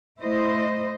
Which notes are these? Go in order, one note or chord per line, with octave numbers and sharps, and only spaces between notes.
A3 E4 C5 D#5